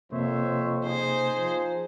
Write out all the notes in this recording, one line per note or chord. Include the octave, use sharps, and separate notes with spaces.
F2 C3 A#3 C4 C5 C#5 E5
D#4 G#4 C5
F3